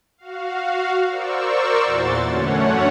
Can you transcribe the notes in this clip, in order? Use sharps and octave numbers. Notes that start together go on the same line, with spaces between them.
F#4 F5
A#4 C5 D5 C#6 E6
E2 A#2 E3 F#4 C6 A6
F#2 D3 A3 C#4 C#5 F#5